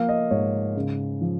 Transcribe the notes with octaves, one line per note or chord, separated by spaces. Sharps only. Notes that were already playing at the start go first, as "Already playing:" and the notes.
Already playing: F3 A#3 F5
D#5
G#2 C#5
C#3
F3